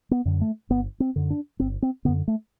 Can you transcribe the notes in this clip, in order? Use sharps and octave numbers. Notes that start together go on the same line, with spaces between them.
B3
F#2 D3
A3
G1 B3
C4
F#2 D3
D4
G1 C4
C4
F#2 D3 B3
A3